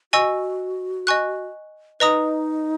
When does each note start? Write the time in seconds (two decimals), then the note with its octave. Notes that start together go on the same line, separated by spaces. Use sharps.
0.13 F#4 D#5 G#5 C#6 E6
1.07 D#5 G#5 C#6 F#6
2.00 D#4 B4 D#5 A#5 D#6